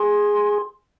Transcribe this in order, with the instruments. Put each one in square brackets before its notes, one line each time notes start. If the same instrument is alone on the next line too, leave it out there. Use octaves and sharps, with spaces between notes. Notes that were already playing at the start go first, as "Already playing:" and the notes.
Already playing: [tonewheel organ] G#4 [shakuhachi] C6